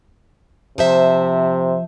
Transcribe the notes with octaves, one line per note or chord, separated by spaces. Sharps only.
C3 F3 C5 E5